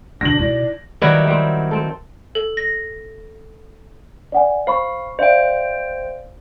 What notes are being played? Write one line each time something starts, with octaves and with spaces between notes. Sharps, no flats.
B2 D3 D4 A#6 F#7
D#4 E4 D5
D#3 F#3 G3 E4 B4 D5
G3 C4
C4 A4
A4
A#6
D5 F#5 G#5
C5 F5 B5 C#6
C5 D5 E5 F5 G5